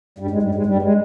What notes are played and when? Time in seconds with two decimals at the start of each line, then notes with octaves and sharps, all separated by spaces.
0.19 G2 G3
0.31 G#2 G#3
0.42 G2 G3
0.55 G#2 G#3
0.66 G2 G3
0.82 G#3